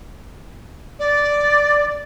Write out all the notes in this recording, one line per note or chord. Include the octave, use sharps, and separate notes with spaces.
D5